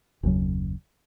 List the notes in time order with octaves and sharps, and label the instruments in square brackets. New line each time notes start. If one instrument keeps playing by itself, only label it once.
[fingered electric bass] F#1 D#2 C#3 F#3